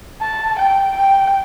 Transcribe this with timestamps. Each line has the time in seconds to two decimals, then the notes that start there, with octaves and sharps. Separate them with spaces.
0.21 A5
0.59 G5
0.97 G5